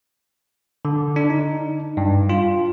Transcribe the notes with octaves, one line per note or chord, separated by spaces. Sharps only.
D3
D4
D#4
G2
F4